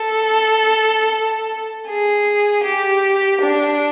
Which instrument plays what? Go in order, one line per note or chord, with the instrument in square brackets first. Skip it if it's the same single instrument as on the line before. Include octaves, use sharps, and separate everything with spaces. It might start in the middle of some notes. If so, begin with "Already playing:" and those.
Already playing: [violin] A4
G#4
G4
D4